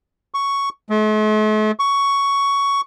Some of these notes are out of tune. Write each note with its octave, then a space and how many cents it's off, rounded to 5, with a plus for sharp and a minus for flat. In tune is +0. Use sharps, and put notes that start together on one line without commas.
C#6 +5
A3 -45
C#6 +10